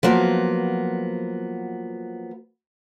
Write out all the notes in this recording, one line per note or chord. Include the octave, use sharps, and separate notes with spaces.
F3 F#3 A#3 B3